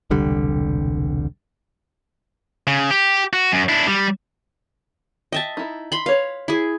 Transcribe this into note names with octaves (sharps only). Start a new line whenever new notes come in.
E1 C2 D3 G3
C#3
G4
F#4
F#2
D4 E4
G3
D#5 E5 G5 A5
D#4 E4
B5 C6
B4 C#5 F5
E4 G#4